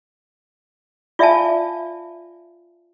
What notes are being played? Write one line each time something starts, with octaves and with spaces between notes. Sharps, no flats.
F4 D5 E5 F5 G#5 A5